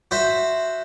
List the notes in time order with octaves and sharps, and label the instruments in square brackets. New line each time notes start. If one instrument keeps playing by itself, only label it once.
[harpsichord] F#4 C5 E5